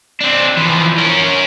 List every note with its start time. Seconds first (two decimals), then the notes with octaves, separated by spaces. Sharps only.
0.20 C4 D4
0.57 E3 F3
0.98 C#4 A#4